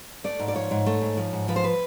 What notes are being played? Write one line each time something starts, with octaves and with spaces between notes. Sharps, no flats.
A3 D5
G#2
D5
F3 C#5
G#2
A3
G#2
F3
G#2
F3 B4
C5
B4